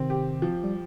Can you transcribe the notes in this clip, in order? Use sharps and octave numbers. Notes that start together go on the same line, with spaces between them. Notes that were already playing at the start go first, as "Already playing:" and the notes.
Already playing: C3 D#3 C4
G4
F3
G3